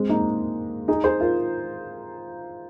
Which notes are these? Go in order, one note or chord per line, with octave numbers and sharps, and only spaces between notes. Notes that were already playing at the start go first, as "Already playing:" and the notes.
Already playing: G#3 C4
A#3 D#4
D#4 G#4
G#4 C5
F4 A#4